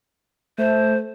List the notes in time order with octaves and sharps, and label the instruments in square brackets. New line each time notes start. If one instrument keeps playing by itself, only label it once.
[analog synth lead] A3 [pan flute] C5